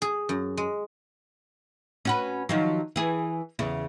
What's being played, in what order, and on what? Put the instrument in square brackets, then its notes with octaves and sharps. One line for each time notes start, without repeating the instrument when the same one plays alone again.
[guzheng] G#4
F#2
G#3
[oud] C#4 F#4 B4
D#3 F3 F#3
E3 G#4
E2 C#3